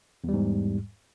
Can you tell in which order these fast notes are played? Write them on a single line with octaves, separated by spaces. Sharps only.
E2 G3 G#2